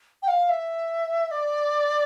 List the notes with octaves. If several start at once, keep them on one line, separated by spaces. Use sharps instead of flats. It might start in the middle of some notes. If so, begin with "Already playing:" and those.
G5
F5
E5
D5